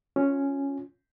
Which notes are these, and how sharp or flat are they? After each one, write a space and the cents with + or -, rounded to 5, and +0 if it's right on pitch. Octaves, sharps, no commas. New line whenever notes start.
C#4 +0 F4 +15